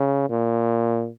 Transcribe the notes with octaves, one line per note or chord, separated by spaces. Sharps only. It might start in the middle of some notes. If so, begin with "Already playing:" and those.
Already playing: C#3
A#2